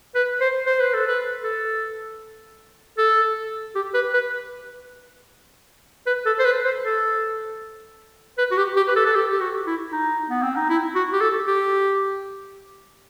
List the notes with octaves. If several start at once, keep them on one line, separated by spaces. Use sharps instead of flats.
B4
C5
C5
B4
A4
B4
A4
A4
G4
B4
B4
B4
A4
C5
B4
C5
A4
B4
F#4
G4
G4
B4
A4
A4
G4
G4
F#4
E4
D#4
B3
C4
D#4
E4
F#4
G4
A4
G4